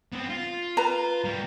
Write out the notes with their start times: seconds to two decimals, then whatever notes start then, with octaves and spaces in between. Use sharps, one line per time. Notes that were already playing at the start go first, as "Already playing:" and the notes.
0.13 B3 C4
0.30 F4
0.77 B4 A#5
1.24 G3 A#4